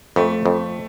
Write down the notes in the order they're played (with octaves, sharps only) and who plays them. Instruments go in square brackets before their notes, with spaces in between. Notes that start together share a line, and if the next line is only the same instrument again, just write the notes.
[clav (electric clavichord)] F2 [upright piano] A3
[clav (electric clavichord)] F2